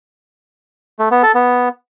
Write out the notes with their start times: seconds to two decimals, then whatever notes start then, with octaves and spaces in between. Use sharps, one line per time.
0.99 A3
1.11 B3
1.23 A4
1.35 B3